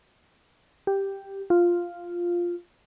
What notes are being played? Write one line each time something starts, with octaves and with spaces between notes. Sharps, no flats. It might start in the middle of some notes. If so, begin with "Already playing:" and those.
G4
F4